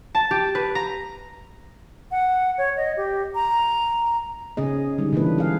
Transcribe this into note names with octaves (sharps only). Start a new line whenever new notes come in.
A5
G4
B4
A#5
F#5
C#5
D#5
G4
A#5
C#3 C#4 G#4 D#5
D3 G3 G#3 D#4
C#3 E3 A#3 D4 E4 B4
G#4 F5